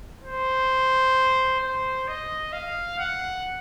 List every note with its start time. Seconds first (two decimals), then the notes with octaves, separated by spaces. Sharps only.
0.24 C5
1.61 C5
2.08 D#5
2.53 F5
2.99 F#5